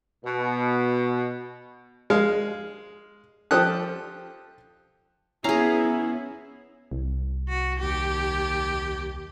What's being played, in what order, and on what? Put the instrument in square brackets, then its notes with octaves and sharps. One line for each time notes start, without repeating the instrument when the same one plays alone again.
[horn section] B2
[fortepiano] G#3 F5
F3 G4 A4 D#6 F#6
[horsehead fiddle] B3 E4 [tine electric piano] C#4 C7 [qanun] G#4 A#5
[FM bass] C2
[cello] F#4
D#2 G4